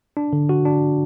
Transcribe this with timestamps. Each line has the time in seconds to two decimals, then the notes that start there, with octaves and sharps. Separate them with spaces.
0.17 D4
0.33 D3
0.49 F#4
0.65 D4